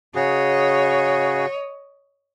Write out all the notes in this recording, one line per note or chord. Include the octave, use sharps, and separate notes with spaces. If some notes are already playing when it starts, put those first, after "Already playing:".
C#3 F#4 G#4 C#5 D#5